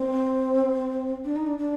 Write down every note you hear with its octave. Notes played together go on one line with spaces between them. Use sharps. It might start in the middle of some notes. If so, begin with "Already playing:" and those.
Already playing: C4
D4
D#4
D4
D4